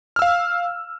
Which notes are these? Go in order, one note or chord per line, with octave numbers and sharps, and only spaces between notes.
F5 E6 F6